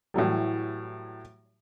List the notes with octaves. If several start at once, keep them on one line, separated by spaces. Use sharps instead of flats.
A2 E3 F#3 G3